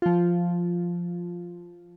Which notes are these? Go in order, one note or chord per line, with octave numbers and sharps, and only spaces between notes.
F3 F4